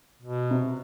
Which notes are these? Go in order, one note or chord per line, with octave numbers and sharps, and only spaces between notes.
B2
C3